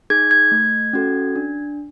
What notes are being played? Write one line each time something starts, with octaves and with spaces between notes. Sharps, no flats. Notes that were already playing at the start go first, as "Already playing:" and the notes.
D#4 G#4 G#6
G#6
A3
C#4 F#4 A4
D4